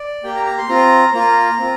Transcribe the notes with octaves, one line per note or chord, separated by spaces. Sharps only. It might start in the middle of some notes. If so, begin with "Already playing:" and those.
Already playing: D5
A#3 G4 G5
A#5
A#5
C6
C4 F4 A#5
A#3 F4 A#5
C4 F4